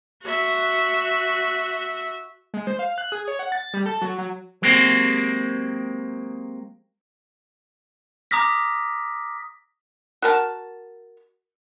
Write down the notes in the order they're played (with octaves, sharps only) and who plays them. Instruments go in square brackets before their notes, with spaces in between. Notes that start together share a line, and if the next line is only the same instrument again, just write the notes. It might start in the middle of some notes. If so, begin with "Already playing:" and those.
[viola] F#4 E5
[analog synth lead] G#3
C5
F5
F#6
G#4
C#5
F#5
A6
G3
A4
F#3
F#3
[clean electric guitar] F#3 G#3 A#3 C4 G4 C5
[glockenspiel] A#5 D6 D#6 F6 A#6 B6
[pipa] F#4 A#4 A5